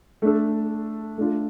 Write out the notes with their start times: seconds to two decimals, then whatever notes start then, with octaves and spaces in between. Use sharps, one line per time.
0.22 A3 D4 A4
1.18 A3 D4 F4